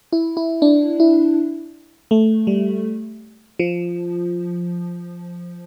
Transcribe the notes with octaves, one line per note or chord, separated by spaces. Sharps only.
E4
E4
D4
E4
A3
G3
F3